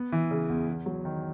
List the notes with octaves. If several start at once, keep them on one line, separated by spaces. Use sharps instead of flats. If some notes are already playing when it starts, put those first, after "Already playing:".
Already playing: B3
E3
C#3
E2
E2
F#3
D#3